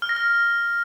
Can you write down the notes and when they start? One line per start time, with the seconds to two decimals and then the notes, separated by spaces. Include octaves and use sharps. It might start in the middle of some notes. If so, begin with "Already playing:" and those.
0.02 F6
0.09 A#6
0.16 F6